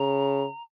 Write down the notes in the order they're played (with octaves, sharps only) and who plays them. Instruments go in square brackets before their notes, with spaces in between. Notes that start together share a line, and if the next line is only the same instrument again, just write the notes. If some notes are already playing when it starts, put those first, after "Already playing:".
Already playing: [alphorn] C#3 [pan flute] A#5